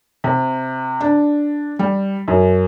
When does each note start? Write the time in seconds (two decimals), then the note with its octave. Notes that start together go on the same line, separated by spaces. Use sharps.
0.24 C3
1.01 D4
1.79 G3
2.28 F#2